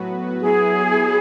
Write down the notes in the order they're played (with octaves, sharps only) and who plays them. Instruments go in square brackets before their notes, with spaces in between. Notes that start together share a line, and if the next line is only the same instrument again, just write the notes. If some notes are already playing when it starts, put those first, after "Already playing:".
Already playing: [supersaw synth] A2 F#3 B3 F#4 B4
[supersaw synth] F#3 B3 E4 [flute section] G#4